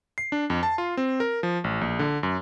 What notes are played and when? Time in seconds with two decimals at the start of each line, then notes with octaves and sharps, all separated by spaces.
0.18 C7
0.32 D4
0.50 F2
0.63 A5
0.78 F4
0.97 C4
1.20 A#4
1.43 F3
1.64 A1
1.81 A#1
1.99 D3
2.23 F#2